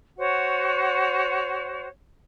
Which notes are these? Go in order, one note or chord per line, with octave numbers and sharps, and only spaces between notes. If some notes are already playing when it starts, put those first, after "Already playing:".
F#4 C5 C#5 F#5